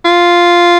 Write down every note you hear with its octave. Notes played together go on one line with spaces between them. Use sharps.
F4